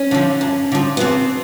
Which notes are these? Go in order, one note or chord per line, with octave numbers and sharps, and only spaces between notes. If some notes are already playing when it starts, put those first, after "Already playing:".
Already playing: C#4
D3 F3
F#2
D3 F3
B3
E2 C4